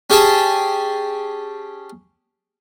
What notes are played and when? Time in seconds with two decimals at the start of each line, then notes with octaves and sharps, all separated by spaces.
0.10 C#4 G4 G#4 G5 A5